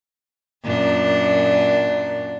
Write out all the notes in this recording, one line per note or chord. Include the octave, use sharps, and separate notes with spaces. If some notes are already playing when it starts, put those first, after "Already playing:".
F#2 A#2 D4